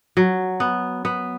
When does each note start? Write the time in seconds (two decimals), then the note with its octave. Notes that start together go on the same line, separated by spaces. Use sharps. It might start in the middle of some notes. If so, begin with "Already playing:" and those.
0.17 F#3
0.60 B3
1.05 B3